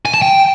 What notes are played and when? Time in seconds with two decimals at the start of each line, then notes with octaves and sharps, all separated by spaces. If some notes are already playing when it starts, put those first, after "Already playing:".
0.06 G#5
0.14 A5
0.22 G5